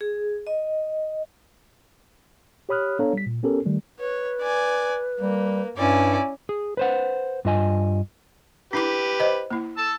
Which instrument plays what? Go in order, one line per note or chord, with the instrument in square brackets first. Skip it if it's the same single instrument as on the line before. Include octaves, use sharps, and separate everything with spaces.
[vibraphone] G#4
D#5
[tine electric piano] G4 C#5 B5 D#6 F6 F#6
B3 D4 A4 C#5 F5 A#5
G3 B6
A#2
B3 C#4 G4 A4 A#4
D#3 G3 A3
[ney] B4 [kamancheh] C#5
[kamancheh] D5 G#5
[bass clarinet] G3 [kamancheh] A#3
[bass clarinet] G2 [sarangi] C#4 [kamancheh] E4 D5
[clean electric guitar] G#4
B4 C5 F#5
G2 F4 D#5 G#5
[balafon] D4 E4 D6 [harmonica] G4 B4
[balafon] C5 D#5
A#3 E4
[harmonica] A5 E6